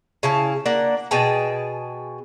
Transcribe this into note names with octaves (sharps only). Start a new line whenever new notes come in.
C#3 E4 A5
A#3 D4 F#5
B2 G#4 G5 A5